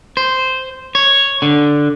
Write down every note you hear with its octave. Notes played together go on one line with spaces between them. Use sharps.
C5
C#5
D3